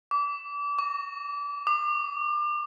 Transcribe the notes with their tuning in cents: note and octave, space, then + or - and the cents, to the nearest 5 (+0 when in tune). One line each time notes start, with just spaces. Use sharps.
D6 -30
C#6 +35
D6 +35